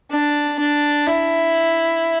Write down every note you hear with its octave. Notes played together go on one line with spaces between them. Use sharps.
D4
D4
E4